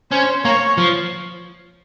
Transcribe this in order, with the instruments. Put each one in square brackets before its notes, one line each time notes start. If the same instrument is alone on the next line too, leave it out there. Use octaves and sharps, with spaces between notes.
[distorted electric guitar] C#4 [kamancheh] C5
[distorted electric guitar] A#3 [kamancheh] C#5
[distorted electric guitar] F3